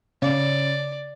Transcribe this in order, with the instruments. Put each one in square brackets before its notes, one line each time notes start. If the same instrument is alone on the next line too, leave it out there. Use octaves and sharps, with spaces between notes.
[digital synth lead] C#3 [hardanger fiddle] D5